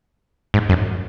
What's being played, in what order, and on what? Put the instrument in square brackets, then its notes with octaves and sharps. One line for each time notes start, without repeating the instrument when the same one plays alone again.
[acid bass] G#2
F#2